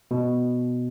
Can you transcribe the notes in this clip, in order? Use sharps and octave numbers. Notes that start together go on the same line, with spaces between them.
B2